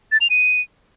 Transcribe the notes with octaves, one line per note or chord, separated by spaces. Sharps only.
A6
F7
D#7